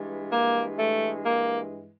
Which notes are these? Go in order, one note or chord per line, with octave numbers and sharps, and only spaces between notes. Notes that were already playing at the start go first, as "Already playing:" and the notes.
Already playing: G2 E3 G#3
A#3
A3
A#3